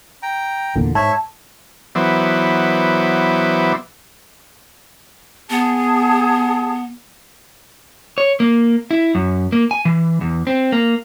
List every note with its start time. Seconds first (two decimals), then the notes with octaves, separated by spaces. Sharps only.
0.23 G5 A#5
0.76 E2 A#2 D3
0.95 G#2 C#5 E5 A5
1.95 E3 F#3 B3 C5 D5 E5
5.50 B3 G#4 A5
8.18 C#5
8.40 A#3
8.91 E4
9.15 F#2
9.52 A#3
9.71 G#5
9.85 E3
10.21 E2
10.47 C4
10.72 A#3